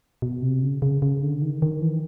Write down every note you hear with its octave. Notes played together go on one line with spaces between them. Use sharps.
B2
C3
C#3
C#3
C#3
D3
D#3
D#3
E3